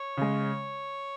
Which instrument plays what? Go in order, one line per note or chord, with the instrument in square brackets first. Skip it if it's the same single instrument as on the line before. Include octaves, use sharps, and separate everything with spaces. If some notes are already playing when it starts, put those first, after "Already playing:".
Already playing: [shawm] C#5
[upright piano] C#3 G#3